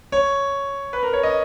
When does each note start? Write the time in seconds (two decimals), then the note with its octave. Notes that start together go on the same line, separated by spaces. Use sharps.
0.12 C#5
0.93 B4
1.03 A#4
1.13 C#5
1.23 D#5